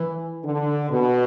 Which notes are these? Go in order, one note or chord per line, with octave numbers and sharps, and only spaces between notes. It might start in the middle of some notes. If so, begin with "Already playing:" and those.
Already playing: E3
D3
B2